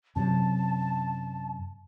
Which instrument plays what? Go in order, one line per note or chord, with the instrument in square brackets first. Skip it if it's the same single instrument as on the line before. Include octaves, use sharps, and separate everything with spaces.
[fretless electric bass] F#2 C3 F#3 [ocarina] A5